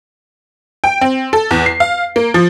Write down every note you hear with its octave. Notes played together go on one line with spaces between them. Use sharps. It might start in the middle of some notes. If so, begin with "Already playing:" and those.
G5
C4
A4
E2
C7
F5
A#3
F3